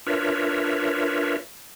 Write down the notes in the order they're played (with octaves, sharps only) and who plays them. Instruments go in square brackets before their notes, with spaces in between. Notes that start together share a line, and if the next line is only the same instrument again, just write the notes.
[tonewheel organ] D4 F4 A#4 B4 C#5 E5